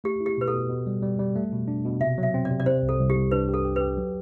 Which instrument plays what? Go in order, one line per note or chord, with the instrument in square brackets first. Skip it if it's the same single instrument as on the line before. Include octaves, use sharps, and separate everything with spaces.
[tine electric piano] A3 [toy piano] G4
[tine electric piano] E4
[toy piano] G4
[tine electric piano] B2 [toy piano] B4
[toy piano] A4
[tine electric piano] B2
B2
G3
G3
G3
A3
B2
D4
B2
[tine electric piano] C3 [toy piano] E5
[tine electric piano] F#3
[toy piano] E5
[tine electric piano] C4
[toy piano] D5
[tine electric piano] C3
[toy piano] D5
[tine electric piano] C3 [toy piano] C5
[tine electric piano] C2
[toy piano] A4
[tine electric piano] C2
[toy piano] G4
[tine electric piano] C2
[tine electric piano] D4 [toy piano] B4
[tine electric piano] G4
[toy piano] A4
[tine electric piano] G4
[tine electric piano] G4 [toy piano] B4
[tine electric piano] F#3